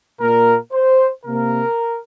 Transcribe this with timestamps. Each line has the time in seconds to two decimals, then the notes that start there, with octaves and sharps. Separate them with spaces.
0.21 A#2 A#3 A#4
0.73 C5
1.26 C3 A#3 A#4